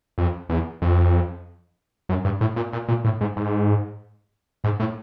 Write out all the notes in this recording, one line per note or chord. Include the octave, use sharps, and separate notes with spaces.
F2
E2
F2
F#2
G2
A2
A#2
A#2
A#2
A2
G#2
G#2
G#2
A2